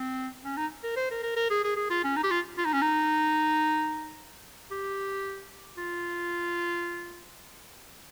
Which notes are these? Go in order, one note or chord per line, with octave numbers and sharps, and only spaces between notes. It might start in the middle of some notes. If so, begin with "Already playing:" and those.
Already playing: C4
C#4
D#4
A#4
C5
A#4
A#4
A#4
G#4
G#4
G#4
F4
C#4
D#4
G4
F4
F4
D#4
C#4
D#4
G4
F4